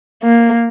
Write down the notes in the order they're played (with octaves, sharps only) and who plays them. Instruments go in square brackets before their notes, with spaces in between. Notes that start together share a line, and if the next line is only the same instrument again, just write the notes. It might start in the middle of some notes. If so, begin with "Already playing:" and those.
[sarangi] A#3